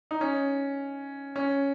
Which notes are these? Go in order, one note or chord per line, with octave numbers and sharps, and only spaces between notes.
D#4
C#4
C#4